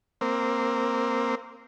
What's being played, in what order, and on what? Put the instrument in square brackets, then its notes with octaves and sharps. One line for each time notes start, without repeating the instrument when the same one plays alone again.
[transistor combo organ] A#3 C4